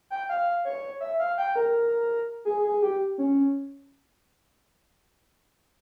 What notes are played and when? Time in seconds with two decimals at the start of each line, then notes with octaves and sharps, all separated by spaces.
0.10 G5
0.29 F5
0.65 C#5
1.01 E5
1.19 F5
1.38 G5
1.56 A#4
2.45 G#4
2.63 G#4
2.82 G4
3.18 C#4